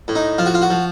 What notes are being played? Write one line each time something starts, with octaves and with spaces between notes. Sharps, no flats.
A2
D#4
F3 F4
F#4
F4
F#4
F3